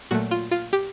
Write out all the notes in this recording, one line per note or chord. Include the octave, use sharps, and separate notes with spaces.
A#2 F#3 A3 F#4
F4
F4
G4